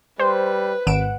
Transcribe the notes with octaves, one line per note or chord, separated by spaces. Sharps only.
G3 B4 C5
G#1 F#5 D7 E7